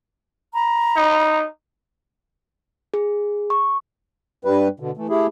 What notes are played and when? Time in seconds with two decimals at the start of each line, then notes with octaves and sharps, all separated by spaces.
0.53 A#5 B5
0.96 D#4
2.94 G#4
3.50 C#6
4.45 G2 G3 B4
4.80 B2 D3
4.97 E3 A3
5.09 A3 E4 G4 G#4